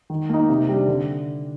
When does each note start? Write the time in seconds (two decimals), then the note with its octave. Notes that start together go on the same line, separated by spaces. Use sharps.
0.10 D#3
0.29 A#3 D#4
0.49 C3
0.69 G3 D4
0.88 D3